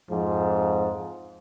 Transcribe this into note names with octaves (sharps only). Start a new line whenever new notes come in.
F2 G#2 F3